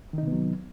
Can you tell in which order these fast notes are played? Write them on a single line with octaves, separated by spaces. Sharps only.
D#3 D#4 C3 B3 F#3